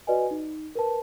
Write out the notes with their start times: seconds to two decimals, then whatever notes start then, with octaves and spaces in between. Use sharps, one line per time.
0.07 F#4 B4 D5 D#5 G#5
0.31 D#4
0.75 A#4 B4 A5